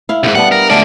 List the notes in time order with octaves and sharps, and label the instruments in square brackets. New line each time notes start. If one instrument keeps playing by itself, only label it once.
[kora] E4 F5
[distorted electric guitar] C2 G#2
[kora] G3 B3 D4 [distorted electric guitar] F#5
[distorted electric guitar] A#4
[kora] D3 A3 F5 [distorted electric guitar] G#3 D5